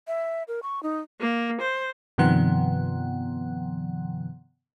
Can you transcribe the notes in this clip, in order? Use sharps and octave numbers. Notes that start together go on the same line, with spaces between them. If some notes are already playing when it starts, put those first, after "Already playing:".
E5
A#4
C#6
D#4
A#3
C5
G2 C3 D#3 F3 B3 F#5